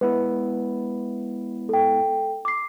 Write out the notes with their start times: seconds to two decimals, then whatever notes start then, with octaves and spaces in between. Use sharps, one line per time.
0.01 G#3 B3 E4 B4
1.69 A4 G5
2.45 D6 C7